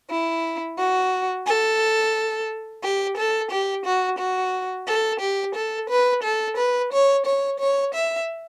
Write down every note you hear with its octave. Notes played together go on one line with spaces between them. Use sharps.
E4
F#4
A4
G4
A4
G4
F#4
F#4
A4
G4
A4
B4
A4
B4
C#5
C#5
C#5
E5